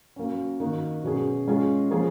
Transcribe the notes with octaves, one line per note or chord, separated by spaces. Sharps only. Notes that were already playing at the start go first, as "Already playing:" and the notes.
F#3 A#3 C#4
D#3 A#3 D#4 F#4 A#4
B2 F#3 C#4 G#4
G#3 C#4 F4 G#4
F3 A#3 C#4 G#4